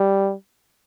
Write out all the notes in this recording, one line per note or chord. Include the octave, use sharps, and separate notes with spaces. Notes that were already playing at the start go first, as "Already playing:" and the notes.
Already playing: G3